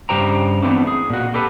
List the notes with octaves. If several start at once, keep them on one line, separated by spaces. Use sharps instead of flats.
G2 C#3 G4 C5 G5 A#5
E3 A3 B3 C4 D4
G#4
A#2 F#4
G4 A4 B4